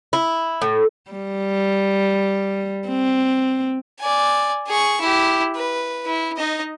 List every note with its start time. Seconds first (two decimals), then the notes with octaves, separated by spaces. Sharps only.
0.13 E4
0.62 A2
1.11 G3
2.88 C4
3.99 D5 G#5
4.67 G#4 C#6
5.01 E4 G4
5.55 B4
6.06 E4
6.37 D#4 D#5